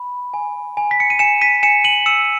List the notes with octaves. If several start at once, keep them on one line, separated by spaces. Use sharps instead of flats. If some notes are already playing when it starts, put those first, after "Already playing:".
Already playing: B5
G#5
G#5
B6
C#7
D#7
G#5 C#7 E7
B6 D#7
G#5 C#7 E7
D#7 F#7
E6 C#7 E7